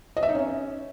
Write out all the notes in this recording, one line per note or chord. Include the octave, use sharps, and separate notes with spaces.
D#5
E5
D#4
C#4